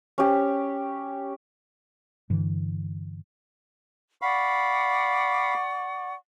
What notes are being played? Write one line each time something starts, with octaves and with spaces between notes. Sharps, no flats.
C#4 G4
G2 D3 E3
D5 F5 F#5 B5 C#6